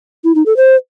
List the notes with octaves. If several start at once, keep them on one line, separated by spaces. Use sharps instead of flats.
E4
D#4
A4
C5